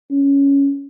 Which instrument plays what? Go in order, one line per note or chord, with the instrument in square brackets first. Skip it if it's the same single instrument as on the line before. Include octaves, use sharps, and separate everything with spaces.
[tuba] C#4